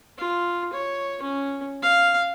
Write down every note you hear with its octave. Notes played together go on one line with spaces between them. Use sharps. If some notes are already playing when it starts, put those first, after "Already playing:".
F4
C#5
C#4
F5